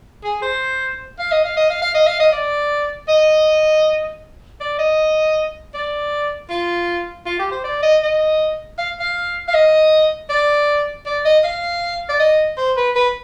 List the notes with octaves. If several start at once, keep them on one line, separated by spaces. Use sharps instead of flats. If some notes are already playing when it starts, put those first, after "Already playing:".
G#4
C5
F5
D#5
F5
D#5
F5
F5
D#5
F5
D#5
D5
D#5
D5
D#5
D5
F4
F4
G4
C5
D5
D#5
D#5
F5
F5
F5
D#5
D5
D5
D#5
F5
D5
D#5
C5
B4
B4